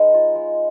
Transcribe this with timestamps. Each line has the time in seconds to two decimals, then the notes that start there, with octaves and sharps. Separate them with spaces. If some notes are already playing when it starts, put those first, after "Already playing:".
Already playing: G#3 D#4 B4
0.14 F4
0.35 G#3